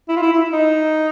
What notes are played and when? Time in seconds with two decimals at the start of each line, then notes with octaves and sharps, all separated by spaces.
0.09 E4
0.16 F4
0.22 E4
0.33 E4
0.53 D#4